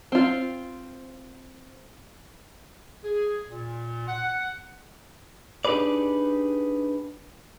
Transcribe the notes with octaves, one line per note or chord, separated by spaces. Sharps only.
C4 F4
G#4
A#2
F#5
D4 D#4 G4 G#4 B4 D5